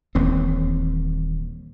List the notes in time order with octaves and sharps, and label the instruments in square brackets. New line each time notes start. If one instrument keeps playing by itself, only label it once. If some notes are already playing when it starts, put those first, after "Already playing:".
[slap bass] D#1 D#2 E3 C4